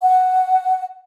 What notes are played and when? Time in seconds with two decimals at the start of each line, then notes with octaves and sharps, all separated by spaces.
0.02 F#5